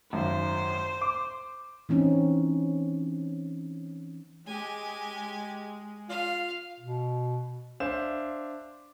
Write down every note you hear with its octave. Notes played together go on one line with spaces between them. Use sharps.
G#1 F#2 C5
D6
E3 C4 C#4 D#4
G#3 G4 G#5
F4 F5
B2
D4 C5 E5 F5 E7